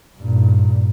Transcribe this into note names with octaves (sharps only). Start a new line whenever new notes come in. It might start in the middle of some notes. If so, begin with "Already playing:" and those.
G2 A#2